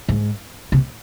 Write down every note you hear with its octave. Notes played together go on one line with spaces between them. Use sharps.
G#2
C3